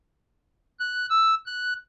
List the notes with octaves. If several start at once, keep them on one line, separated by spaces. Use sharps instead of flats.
F#6
E6
F#6